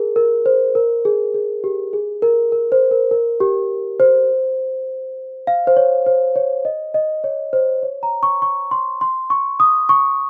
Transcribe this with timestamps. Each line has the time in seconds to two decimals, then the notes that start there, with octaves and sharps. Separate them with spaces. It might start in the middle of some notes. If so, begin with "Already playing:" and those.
Already playing: G#4 A#4
0.16 A#4
0.46 C5
0.75 A#4
1.05 G#4
1.34 G#4
1.64 G4
1.93 G#4
2.22 A#4
2.52 A#4
2.72 C5
2.91 A#4
3.11 A#4
3.40 G4
4.00 C5
5.47 F5
5.67 C5
5.77 C#5
6.06 C5
6.36 C#5
6.65 D#5
6.94 D#5
7.24 C#5
7.53 C5
7.83 C#5
8.03 A#5
8.23 C#6
8.42 C#6
8.71 C6
9.01 C6
9.30 C#6
9.60 D#6
9.89 C#6